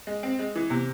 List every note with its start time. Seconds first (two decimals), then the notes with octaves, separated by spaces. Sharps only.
0.07 G#3
0.23 C4
0.39 G#3
0.55 E3
0.70 C3